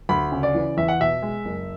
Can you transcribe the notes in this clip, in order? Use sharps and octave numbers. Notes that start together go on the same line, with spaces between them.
D2 B5
C#3
D5
E3
E2 E5
F#5
B2 E5
G#3
F#1